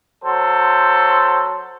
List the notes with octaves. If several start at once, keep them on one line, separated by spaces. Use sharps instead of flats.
F#3 A4 C5